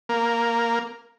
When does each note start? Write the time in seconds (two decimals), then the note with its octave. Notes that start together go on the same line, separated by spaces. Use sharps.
0.09 A#3